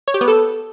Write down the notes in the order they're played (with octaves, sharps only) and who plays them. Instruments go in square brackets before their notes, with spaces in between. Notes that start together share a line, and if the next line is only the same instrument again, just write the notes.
[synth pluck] C#5
G4
B3
A4